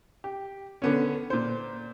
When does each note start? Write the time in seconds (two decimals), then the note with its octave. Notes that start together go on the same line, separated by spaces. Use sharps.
0.24 G4
0.82 D3 B3 C#4
1.30 A#2 C5